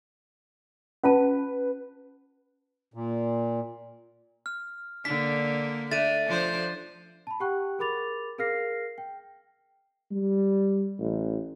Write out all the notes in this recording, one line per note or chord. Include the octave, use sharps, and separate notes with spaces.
C#4 F4 B4 A5
A#2
F6
D3 A#3 D4 B6
A3 D4 A6 D#7
F3 D4 C5
A5 B5
G4 F#5 G5 C#6 F#6
G#4 A#4 B5 D6 A6 F7
G#4 A#4 F5 F6 A#6 C7
G5
G3
A1